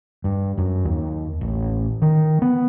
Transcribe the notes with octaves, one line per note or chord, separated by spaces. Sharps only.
G2
F#2
D#2
A1
D#3
B3